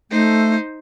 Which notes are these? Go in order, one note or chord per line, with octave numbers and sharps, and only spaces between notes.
A3 D#4 C5